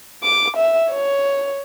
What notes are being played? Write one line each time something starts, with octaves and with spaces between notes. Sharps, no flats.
D6
E5
C#5